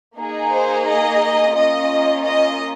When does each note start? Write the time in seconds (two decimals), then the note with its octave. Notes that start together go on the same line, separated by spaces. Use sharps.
0.16 A#3 D#4 G#4
0.51 C5
0.86 D#5
1.54 A#3 C#4 F4 D#5
2.24 D#5